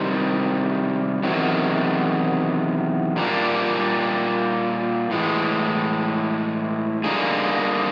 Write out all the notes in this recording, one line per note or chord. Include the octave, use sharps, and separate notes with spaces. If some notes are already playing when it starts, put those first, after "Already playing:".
Already playing: C3 D#3 G3
E2 C3 D#3 F#3
A#2 G3 A#3 D4
A2 E3 G#3
D3 G3 A#3 D#4 G#4